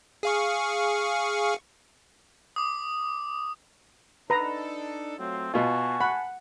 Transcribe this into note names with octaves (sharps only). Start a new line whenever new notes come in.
G#4 F5 C#6
D6 D#6
D4 D#4 A4 B4 A#5
F#3 A3 C4 F4
B2 F4 F#4 G#5 A5
F#5 B5